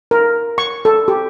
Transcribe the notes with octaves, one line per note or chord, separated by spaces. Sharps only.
A#4
C#6
A4
G4